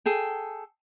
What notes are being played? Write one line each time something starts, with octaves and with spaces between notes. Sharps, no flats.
G#4 A4 G5